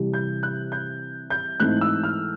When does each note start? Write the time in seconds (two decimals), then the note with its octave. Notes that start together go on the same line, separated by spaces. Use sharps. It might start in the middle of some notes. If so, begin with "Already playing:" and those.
Already playing: C3 E3 G3
0.14 G6
0.43 F#6
0.72 G6
1.30 G6
1.60 G#2 E3 A3 C4 D#4 F#6
1.81 E6
2.04 F6